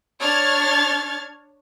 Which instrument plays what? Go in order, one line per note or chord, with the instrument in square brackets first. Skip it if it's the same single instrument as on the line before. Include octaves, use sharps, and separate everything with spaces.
[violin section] D4 C#5 F6 G#6 A6